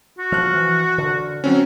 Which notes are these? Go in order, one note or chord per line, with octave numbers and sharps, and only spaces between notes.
F#4
F3 F6 F#6
E3
D3
F#3 C4 C#4